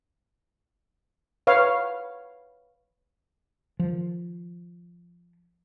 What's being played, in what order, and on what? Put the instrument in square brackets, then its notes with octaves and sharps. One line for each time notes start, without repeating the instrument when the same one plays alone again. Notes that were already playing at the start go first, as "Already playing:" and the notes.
[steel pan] B4 C#5 F5
[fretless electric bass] D#3 F3